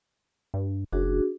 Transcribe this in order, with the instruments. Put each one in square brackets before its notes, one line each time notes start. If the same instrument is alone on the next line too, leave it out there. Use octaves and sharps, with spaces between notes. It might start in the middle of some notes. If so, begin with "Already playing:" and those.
[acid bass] G2
[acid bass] F#1 [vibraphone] D4 F#4 G#4